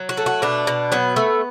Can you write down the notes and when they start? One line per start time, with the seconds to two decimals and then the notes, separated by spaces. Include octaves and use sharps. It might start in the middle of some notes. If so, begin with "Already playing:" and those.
Already playing: F#3
0.09 F#4
0.17 A3
0.26 F#4
0.42 B2 D4
0.67 B2
0.92 F#3 B3
1.16 A3